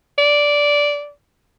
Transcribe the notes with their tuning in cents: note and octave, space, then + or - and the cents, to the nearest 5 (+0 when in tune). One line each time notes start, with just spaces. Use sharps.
D5 -10